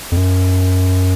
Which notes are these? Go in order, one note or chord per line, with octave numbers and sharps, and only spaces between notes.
F2
F#2